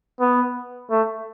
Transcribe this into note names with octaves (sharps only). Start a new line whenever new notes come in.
B3
A3